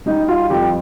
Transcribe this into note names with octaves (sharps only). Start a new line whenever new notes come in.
G3 D#4
F4
F2 G4